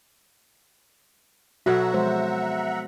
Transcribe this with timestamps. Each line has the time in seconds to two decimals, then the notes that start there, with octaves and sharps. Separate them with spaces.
1.66 B2 F#3 F#4 A4 B4 E5 F#5 A#5
1.93 F3 G#3 C5